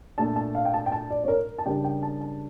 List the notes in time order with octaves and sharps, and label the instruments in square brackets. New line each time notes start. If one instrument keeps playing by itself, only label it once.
[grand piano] A#2 A3 D4 [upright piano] A5
[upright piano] A5
F5
G5
A5
G5
A5
D5
C#5
A#4
A5
[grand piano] C#3 G3 D4 G4 A#4 [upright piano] G5
[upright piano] G5
A5
A5